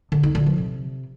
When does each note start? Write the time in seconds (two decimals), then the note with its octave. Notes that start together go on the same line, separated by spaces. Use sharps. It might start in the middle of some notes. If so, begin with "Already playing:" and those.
0.12 D3
0.23 D#4
0.35 D3
0.46 F3
0.58 C3